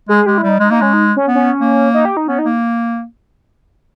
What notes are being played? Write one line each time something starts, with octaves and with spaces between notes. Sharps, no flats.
G#3 G#4
G#3 G4
E4
G3
D#4
G#3 D#4
A#3 D#4
G#3 C#4
D#4
C#4
B3
C#4
A#3
D#4
G4
D#4
B3 C#4
D#4
A#3